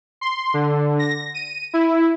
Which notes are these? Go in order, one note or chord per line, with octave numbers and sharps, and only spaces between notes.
C6
D3
A#6
D#7
E4